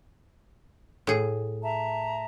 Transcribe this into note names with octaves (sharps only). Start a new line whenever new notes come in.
A2 G#4
E5 A5 A#5